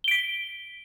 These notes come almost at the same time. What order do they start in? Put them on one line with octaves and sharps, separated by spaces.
G7 D7 B6